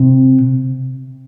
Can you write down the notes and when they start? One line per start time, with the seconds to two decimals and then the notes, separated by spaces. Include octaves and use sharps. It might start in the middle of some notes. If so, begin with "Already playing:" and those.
Already playing: C3